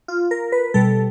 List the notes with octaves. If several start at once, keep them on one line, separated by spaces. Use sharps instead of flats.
F4
A#4
B4
B2 G3 A4